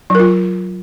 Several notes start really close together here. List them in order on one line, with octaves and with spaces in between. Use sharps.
F#3 A#4 F4